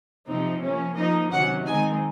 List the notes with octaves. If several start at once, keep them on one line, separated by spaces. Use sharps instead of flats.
C3 F3 C4 D#4
F3 A#3 C#4
F3 A#3 D#4 D#5
C3 D#3 F#3 C#4 F#5
D#3 G#3 C4 D#4 G#5